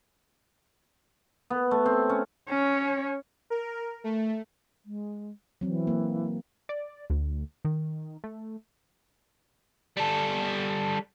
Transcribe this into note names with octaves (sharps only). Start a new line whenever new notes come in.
B3
A3
C4
C#4
C#4 C#5
A#4
A3
G#3
E3 F#3 C4
A#3
D5
D2
D#3
A3
G3 A4